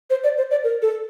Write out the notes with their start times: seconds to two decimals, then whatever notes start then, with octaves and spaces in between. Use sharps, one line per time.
0.10 C5
0.24 D5
0.38 C5
0.51 D5
0.64 A#4
0.82 A4